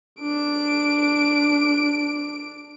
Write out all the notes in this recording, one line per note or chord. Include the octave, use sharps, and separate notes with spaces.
D4 D7